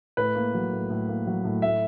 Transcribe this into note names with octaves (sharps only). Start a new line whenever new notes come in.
A2 B4
A#3
F#3
A2
A2
A#3
F#3
A2
A2 E5